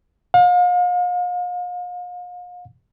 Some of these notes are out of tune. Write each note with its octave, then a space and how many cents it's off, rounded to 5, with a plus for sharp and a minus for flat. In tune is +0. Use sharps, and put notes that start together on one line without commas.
F5 +40